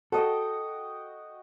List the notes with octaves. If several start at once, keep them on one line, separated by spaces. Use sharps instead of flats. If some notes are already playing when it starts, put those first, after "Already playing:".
F#4 A4 D#5 G5